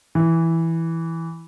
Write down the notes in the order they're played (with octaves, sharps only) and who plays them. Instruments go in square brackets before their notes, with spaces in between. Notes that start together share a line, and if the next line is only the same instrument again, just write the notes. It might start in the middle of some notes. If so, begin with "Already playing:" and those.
[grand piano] E3